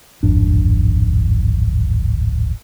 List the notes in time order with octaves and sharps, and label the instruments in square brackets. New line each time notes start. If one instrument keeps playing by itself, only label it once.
[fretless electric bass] D1 G#1 F2 D4